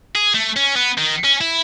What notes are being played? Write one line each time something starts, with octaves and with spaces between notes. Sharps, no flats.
G#4
A3
C#4
B3
D#3
C#4
E4